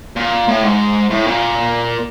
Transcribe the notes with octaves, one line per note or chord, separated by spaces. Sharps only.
A#2
A2
G#2
A2
A#2